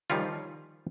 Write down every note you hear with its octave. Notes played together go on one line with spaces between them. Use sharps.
D#3 F3 G3 C#4 F4